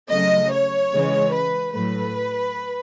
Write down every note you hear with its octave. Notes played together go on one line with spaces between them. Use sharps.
C#3 F#3 A3 D#5
C#5
C#3 E3 G#3
B4
A2 F#3 A3 B4